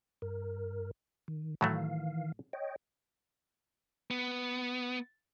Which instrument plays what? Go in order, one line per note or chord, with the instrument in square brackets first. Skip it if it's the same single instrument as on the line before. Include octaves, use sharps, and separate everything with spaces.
[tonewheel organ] G2 A#4
D#3
[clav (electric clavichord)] A2 F#3 A3 [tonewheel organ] D#3 E3 F5
[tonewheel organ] C#5 D#5 G5
[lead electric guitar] B3